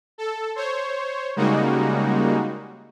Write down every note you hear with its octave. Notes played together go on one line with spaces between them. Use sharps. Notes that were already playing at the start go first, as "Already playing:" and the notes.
A4
C5 C#5
C#3 G3 G#3 A#3 D#4 F#4